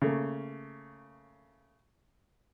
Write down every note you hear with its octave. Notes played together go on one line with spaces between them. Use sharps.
C#3 A3 A#3